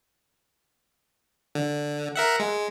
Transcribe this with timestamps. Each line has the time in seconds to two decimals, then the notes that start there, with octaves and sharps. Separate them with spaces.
1.55 D3
2.15 A#4 E5 F#5
2.39 G#3